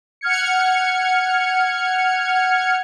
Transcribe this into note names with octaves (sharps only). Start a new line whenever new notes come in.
F#5 F6 G#6 C#7